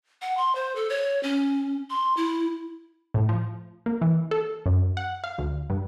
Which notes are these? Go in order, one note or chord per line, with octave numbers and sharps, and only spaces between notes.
F#5
C6
C5
A4
C#5
C#4
C6
E4
A2
F3
A#3
E3
A4
F#2
F#5
F5
D2
G2